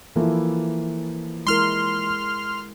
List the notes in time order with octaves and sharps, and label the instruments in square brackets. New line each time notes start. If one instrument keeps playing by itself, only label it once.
[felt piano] E3 F3 A#3 [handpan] E4 A4
[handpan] G#3 E4 A#4 [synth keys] C6 F6